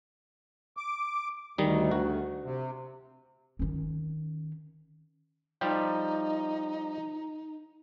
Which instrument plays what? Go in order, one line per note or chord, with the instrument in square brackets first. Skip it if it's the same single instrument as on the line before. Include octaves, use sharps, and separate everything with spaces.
[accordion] D6
[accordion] D2 [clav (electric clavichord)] D#3 G3 D#4
[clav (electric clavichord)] F#4
[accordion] C3
[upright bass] D#3 C#4
[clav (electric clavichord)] F3 G3 G4 [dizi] D#4